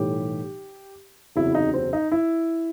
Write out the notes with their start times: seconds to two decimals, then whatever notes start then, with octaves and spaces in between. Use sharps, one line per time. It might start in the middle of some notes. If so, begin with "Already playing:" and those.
Already playing: B1 A2 E3 G3 G4
1.35 F#1 E2 C3 F#3 E4
1.55 D#4
1.74 C4
1.93 D#4
2.12 E4